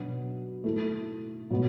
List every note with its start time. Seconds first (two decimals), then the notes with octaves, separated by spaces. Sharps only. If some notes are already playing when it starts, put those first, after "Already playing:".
Already playing: B2 F#3 B3 D4
0.64 A3 E4 A4
1.50 B2 F#3 B3